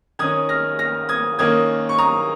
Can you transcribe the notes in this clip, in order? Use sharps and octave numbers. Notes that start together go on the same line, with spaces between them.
D#3 C#4 D#6 G#6
F6 A#6
F6 A#6
D#6 G#6
D#3 A#3 C#4 D#6 G#6
C#6
A#5 D#6